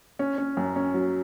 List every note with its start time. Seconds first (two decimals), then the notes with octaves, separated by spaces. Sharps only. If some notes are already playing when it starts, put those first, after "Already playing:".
0.19 C#4
0.38 C#4
0.57 F#2
0.76 C#4
0.94 F#3